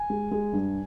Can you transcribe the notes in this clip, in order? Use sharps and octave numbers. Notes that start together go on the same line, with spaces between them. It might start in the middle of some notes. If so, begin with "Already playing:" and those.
Already playing: G#5
G#3
G#3
G2